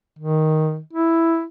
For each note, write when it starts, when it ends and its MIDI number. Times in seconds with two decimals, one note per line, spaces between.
0.19 0.80 51
0.93 1.44 64